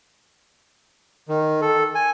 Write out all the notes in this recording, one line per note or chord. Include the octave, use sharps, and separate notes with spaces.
D#3
A4
G#5